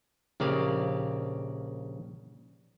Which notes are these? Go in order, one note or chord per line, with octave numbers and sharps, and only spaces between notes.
A#1 C#3 A#3 G4 D5 F5